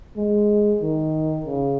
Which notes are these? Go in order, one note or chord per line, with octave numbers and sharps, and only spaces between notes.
G#3
D#3
C#3